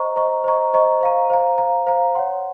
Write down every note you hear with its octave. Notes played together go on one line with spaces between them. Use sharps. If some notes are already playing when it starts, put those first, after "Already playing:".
Already playing: C5 D#5 A#5 C#6
C5 D#5 A#5 C#6
C5 D#5 A#5 C#6
C5 D#5 A#5 C#6
C5 F5 A#5
C5 F5 A#5
C5 F5 A#5
C5 F5 A#5
C#5 F#5 C6